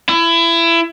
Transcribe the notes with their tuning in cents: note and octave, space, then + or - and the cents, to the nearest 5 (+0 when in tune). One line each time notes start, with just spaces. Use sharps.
E4 +25